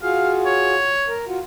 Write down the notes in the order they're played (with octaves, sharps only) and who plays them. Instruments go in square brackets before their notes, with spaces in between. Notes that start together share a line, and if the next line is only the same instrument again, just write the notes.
[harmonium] F4 F#4 G#4 [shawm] F5
[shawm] C#5
[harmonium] A#4
F4 F#4